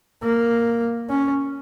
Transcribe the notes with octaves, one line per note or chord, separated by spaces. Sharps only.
A#3
C#4